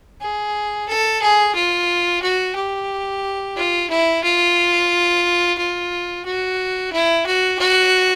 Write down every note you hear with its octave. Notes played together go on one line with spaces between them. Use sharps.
G#4
A4
G#4
F4
F#4
G4
F4
E4
F4
F4
F#4
E4
F#4
F#4